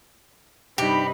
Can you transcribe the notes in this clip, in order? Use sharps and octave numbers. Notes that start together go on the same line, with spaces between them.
G2 C3 D#4 G4 B5